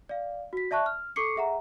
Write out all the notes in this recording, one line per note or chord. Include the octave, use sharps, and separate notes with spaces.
D5 F5
F#4 B6
D5 E5 A5 C#6 F#6
F6
A4 C#6 D6 C7 C#7
G#4 E5 F#5 A#5